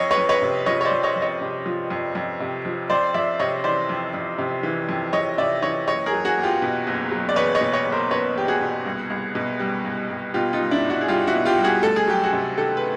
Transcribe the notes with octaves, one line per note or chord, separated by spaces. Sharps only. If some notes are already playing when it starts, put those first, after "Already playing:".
Already playing: F2 C#5 D#5
B4 C#5
F2
B4 C#5
C3
F3 C#5 D#5
C#5
C5 D5
F2
C#5 D#5
F2
C#5 D#5
C3
F3
F2
F2
C3
F3
F2 C5 D5
F2 D5 E5
C3 C#5 D#5
E3 C5 D5
F2
F2
C3
E3
F2
F2 C#5 D#5
C3 D5 E5
E3 C#5 D#5
F#1 C#5 D#5
G#4 A#4
F#3
F#4 G#4
E2
F4 G4
B2
F#1
F#3
D5
E2 B4 C#5
C#5 D#5
B2
C#5 D#5
F#1
A#4 C5
F#3 B4 C#5
E2 G4
F#4 G#4
B2
C2
C2
B2
G3
C2
C2
B2 F4 G4
D#4 F4
G3
D4 E4
C2
E4 F#4
G#4
C2 F4 G4
E4 F#4
B2
F4 G4
G3
F#4 G#4
D2 A4
G#4
F#3 G4
F#4 G#4
C3
D#3 G4 A4
B4